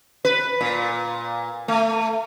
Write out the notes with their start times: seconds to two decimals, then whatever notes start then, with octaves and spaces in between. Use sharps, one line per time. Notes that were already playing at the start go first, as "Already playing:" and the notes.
0.25 B4
0.61 A#2
1.68 A3